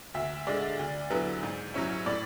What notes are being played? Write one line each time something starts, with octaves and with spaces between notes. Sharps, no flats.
D2 E5
D3 G#3 D5
D2
D3 F#3 B3 E4
G#2
F#3 C#4 E4
A2 D5